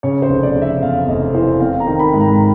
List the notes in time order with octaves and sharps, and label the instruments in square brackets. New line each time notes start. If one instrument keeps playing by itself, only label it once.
[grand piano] C#3 C#5
C5
F1
D5
F1
E5
E2 F5
F1 D#5
E3 C5
C4 F5
A#5
D#3
B5
G#2
A#5